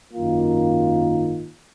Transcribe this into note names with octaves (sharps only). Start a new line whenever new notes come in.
G#1 F#2 D#3 A#3 F4